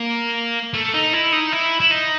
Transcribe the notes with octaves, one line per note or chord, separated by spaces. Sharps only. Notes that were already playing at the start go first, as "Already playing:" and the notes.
Already playing: A#3
A3
D#4
E4
D#4
E4
E4
D#4